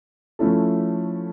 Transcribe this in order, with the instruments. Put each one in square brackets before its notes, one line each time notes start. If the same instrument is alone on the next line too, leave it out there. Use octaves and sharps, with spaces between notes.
[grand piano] F3 A3 C#4 E4 A4